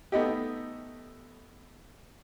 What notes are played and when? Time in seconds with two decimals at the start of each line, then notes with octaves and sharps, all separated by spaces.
0.12 A3 B3 D#4 G4